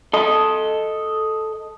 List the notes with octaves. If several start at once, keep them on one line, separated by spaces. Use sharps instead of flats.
A4 D#5